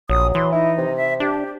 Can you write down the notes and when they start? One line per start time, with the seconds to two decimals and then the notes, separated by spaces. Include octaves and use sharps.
0.09 A#1 F#3 D#6
0.35 E3 C6
0.52 D#4 E4
0.78 C3
0.96 E5
1.20 D4 G4